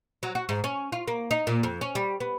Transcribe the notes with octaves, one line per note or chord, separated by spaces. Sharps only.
F#3
F#4
G#2
C#4
F4
A#3
D#4
A#2
F2
C#4
G3
B3